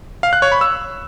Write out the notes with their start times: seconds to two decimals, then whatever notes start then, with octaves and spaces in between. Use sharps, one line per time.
0.23 F5
0.33 F#6
0.42 C#5
0.52 B5
0.61 E6